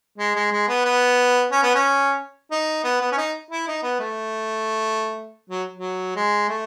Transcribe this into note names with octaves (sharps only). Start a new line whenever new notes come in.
G#3
G#3
G#3
B3
B3
C#4
B3
C#4
D#4
B3
B3
C#4
D#4
E4
D#4
B3
A3
F#3
F#3
G#3
A3